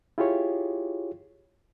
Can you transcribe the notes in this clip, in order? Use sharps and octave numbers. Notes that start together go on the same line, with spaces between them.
E4 F4 G4 G#4 C#5